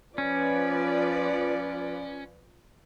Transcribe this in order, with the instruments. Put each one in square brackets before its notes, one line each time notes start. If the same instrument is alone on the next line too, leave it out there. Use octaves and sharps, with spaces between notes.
[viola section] F3 B4 D5 [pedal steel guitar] C#4